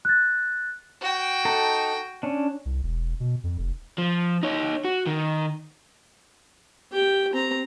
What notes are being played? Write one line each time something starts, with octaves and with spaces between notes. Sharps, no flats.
F#6 A6
F#4 G5
D#4 A4 A#5
C#4 D4
C2
E1
B2
F2
F1
F3
D#4 C#5
F#4
D#3
G4 G5
C4 A#5